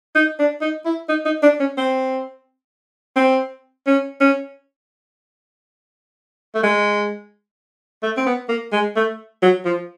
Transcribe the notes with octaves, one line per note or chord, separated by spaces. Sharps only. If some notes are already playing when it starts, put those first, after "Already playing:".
D#4
D4
D#4
E4
D#4
D#4
D4
C#4
C4
C4
C#4
C#4
A3
G#3
A3
C4
B3
A#3
G#3
A3
F#3
F3